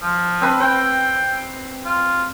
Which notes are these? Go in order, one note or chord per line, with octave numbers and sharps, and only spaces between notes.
F3
C4 B4 B5
C4 G5
F4